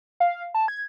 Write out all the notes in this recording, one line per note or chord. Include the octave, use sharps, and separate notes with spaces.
F5
A5
G#6